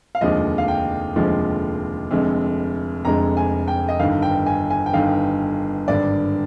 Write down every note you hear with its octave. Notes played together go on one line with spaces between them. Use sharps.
F5
F1 D#2 D3 F3 G#3 D#5
F5
G5
F1 D#2 D3 F3 G#3
F1 F2 D3 G#3
F1 F2 D3 G#3 A#5
G#5
G5
D#5
G1 G2 D#3 F5
G5
G#5
G#5
G5
G1 G2 D#3 F5
G#1 G2 D3 D5